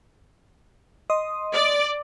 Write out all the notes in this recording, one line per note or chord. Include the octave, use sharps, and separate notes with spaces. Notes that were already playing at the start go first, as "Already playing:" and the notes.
D#5 C6 D#6
D5